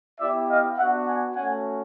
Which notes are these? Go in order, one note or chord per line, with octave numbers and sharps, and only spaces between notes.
B3 E4 G4 D5 E5
D#5 F5
B3 D4 F#4 E5 F#5
F#5 G#5
A3 C#4 F#4 F#5 G#5